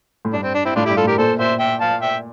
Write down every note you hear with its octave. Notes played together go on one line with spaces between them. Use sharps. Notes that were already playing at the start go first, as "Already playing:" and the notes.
A2
G2 D4
C4
D4
C4 E4
A2 D4 F4
E4 G4
G2
F4 A4
A2 G4 A#4
A#2 A4 C5
A#2 C5 E5
E5 G5
F5 A5
E5 G5